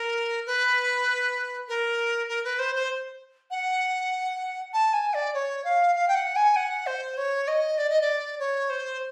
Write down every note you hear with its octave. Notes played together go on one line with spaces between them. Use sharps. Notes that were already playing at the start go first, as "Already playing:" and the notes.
Already playing: A#4
B4
A#4
A#4
B4
C5
C5
F#5
A5
G#5
D5
C#5
F5
F5
G5
F#5
G#5
F#5
C5
C#5
D#5
D5
D#5
D5
C#5
C5